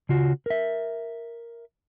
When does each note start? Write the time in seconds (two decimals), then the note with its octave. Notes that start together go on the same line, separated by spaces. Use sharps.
0.09 C#3 F4 F#4
0.46 A#4 E5